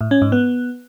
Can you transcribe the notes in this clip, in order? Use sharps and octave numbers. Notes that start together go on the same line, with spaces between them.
A2
C#4
G#2
B3